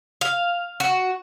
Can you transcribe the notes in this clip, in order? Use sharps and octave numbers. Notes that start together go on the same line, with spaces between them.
F5
F#4